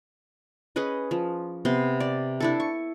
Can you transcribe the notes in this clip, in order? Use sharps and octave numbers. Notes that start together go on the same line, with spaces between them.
C#4 G#4 B4 D#5
F3
C3 B3 C6
D5
D4 E4 A4
C#6